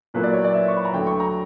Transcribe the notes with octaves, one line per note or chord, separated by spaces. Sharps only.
A#2 F#3 A#3 E4 B4
D5
C#5
D5
E5
C#6
B5
A#5
D2 D3 F#3 G5
C#6
A#5